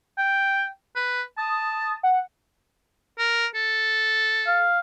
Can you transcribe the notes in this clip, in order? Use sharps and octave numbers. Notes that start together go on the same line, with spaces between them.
G5
B4
A5 D#6
F#5
A#4
A4
F5